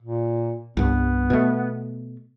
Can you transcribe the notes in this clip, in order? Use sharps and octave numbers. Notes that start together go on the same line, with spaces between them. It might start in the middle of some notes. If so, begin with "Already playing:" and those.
A#2
C2 G2 B3
B2 A3